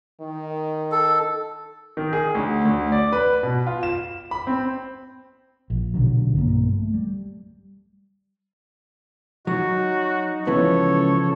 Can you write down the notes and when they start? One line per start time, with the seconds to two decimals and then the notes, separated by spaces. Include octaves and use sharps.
0.21 D#3
0.92 A4
1.97 D#3
2.13 G#4
2.35 D2
2.65 D2
2.92 D5
3.13 B4
3.43 B2
3.67 F4
3.83 E7
4.31 B5
4.47 C4
5.70 A#1
5.94 A#1 B2 D3 F#3
6.33 B1 G2 B2 A#3
6.68 A3
6.94 G3
9.47 F#3 D#4 F#4
10.47 C#2 C#3 E3 F3 B3 A4 C#5